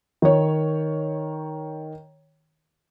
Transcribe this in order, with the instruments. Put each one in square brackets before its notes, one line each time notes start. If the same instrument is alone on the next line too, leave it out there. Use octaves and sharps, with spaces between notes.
[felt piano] D#3 C#5